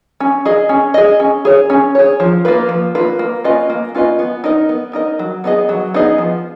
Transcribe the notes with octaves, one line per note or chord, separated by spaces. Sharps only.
C#4
G#4 D#5
C#4
G#4 D#5
C#4
G#4 C#5
C#4
G#4 C#5
F3
A#3 F4 B4
F3
A#3 F4 B4
A#3
C#4 F4 B4 D#5
A#3
C#4 F4 B4 D#5
B3
D#4 A#4 D#5
B3
D#4 A#4 D#5
F#3
B3 D#4 G#4 D#5
F#3
B3 D#4 G#4 D#5
F3